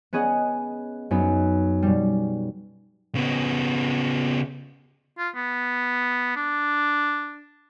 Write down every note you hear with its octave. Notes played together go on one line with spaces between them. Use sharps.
B3 C#4 G#4 D#5 F#5
F#2 B3 D#4
B2 G3
C#3 B3
F4
B3
D4